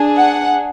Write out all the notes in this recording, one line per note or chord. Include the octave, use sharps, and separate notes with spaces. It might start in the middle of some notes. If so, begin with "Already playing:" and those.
Already playing: D4 G#4
F#5